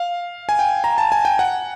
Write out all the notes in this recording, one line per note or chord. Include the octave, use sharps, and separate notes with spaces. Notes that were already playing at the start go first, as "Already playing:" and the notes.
Already playing: F5
G#5
G5
A#5
A5
G#5
G5
F#5